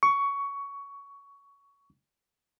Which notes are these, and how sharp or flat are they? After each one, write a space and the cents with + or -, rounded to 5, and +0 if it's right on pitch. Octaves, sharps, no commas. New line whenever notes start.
C#6 +15